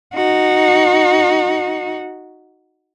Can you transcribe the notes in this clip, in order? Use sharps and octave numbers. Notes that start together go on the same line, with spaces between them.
D#4 F#4